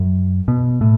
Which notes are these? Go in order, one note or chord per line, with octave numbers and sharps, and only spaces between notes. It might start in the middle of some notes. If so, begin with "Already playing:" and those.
Already playing: F#2
B2
A2